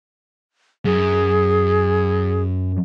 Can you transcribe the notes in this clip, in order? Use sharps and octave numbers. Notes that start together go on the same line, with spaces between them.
F#2 G#4